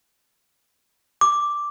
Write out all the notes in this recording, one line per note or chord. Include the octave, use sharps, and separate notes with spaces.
D6